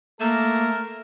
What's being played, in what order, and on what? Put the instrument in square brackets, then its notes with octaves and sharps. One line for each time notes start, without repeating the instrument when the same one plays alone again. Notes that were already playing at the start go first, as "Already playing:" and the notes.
[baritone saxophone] A3 [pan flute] A#3 [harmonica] A#4